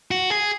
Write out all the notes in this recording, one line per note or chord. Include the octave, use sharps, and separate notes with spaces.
F#4
G#4